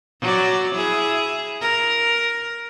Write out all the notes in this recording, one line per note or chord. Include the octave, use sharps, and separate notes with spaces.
F#3 D5
E4 G#4
A#4